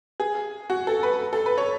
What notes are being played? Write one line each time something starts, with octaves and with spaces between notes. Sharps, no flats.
G#4
F#4
A4
B4
A4
B4
C#5